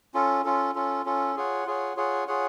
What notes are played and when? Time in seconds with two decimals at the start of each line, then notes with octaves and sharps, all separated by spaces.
0.14 C#4 F4 A4
0.44 C#4 F4 A4
0.75 C#4 F4 A4
1.06 C#4 F4 A4
1.36 F4 G#4 C#5 F#5
1.66 F4 G#4 C#5 F#5
1.96 F4 G#4 C#5 F#5
2.28 F4 G#4 C#5 F#5